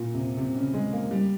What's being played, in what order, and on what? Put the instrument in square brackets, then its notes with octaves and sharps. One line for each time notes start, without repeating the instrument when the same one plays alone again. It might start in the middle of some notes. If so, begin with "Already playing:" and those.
Already playing: [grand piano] A#2
C3
C3
C#3
G#3
A#3
G3